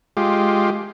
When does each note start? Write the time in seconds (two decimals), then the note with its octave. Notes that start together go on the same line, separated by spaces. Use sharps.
0.17 G#3 F4 G4